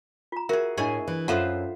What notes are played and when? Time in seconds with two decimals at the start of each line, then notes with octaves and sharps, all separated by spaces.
0.32 F4 A#5
0.49 F#4 G#4 A#4 E5
0.77 A2 D4 E4 G#4 D#5 G#5 C#6
1.08 E3
1.28 F#2 F4 A4 B4 C5 E5 F#5